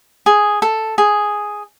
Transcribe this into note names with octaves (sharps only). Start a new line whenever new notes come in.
G#4
A4
G#4